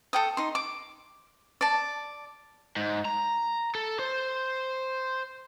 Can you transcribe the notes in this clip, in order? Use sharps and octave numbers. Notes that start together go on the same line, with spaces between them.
A4 G5 D#6
D#4 C6
D6
D5 A5
G#2
A#5
A4
C5